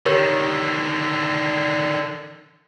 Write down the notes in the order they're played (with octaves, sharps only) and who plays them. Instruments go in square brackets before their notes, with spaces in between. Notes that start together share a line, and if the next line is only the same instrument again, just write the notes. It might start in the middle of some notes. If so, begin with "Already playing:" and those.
[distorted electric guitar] D3 D#3 [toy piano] G4 A#4 C#5